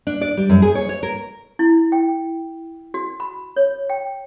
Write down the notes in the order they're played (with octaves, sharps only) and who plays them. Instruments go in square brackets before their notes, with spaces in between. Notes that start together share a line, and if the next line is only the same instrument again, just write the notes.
[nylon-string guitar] D4
D5
G3
F#2
G#4
C#5
C#5
A#4
[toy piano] E4
G5
F#4
B5
C#5
G5